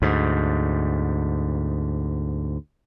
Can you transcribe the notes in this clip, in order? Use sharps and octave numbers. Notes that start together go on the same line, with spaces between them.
D2 G#2